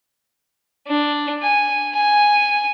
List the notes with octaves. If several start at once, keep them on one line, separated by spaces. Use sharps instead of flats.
D4
G#5
G#5